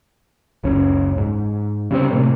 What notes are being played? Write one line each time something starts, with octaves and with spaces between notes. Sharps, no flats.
F#1 C#2 C#4
G#2
C#3 G3 G#3 C4
A2 C3 A#3